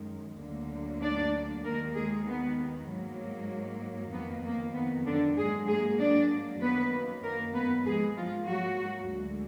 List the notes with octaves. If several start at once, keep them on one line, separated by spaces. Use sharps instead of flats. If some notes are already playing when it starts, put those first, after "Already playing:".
Already playing: F#2 D#3 G#3
D2 D3 F#3 A#3
D4 D5
D#2 D#3 G#3 A#3 A#4
G#3 G#4
B3
G#2 F#3 A#3
F2 D#3 A#3 B3
A#3
B3
D3 D4
G#2 F#3 G#3 A#3 G#4
G#3 G#4
D4 D5
F#2 D#3 F#3 A#3 B3 B4
A#3 A#4
B3 B4
G#2 F3 G#3 A#3 G#4
F3 F4
F#3 F#4
D2 D3 G#3